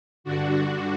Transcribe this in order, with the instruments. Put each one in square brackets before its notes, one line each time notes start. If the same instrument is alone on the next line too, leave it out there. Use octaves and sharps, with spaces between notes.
[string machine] G2 D3 D4 F#4